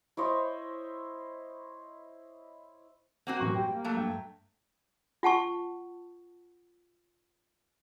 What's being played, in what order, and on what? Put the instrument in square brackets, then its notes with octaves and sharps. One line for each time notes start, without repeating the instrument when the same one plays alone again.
[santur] E4 C5 C#5 D#5
[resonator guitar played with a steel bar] A#3 C4 F#4 [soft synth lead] F#5
[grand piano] F#2 A2 E3 [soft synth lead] C#6
[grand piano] G3 [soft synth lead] G5
[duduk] A#3
[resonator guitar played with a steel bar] F#3 A3 [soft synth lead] F5
[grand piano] G2 [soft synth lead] G5
[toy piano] F4 F#5 A5 C#6